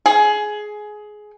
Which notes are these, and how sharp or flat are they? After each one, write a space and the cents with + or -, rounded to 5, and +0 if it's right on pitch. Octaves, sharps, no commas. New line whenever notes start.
G#4 +15